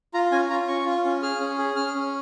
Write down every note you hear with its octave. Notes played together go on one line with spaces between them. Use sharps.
F4 A#5
C#4 G#5
F4 A#5
C#4 C#6
F4
C#4
G#4 F6
C#4
G#4
C#4 F6
C#4